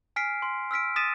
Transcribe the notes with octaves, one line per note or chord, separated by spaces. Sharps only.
G#5 F6 B6 C7 D7
C6
E6 F6 B6 D7
D#6 A6 B6 D#7 E7